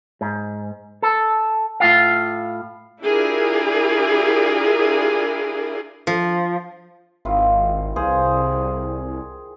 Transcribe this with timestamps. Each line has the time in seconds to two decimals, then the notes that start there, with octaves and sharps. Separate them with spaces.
0.21 G#2
1.02 A4
1.80 A2 F4 F5
3.02 D4 E4 F4 G4 G#4 A#4
6.07 F3
7.25 G#1 D#3 E4 F4
7.96 C2 G#4 C5 F5